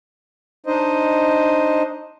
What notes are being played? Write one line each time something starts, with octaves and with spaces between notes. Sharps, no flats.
D4 D#4 C5 D#5